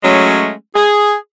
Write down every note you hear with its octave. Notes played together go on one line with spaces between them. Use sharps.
F#3 G#3 A3 C#4
G#4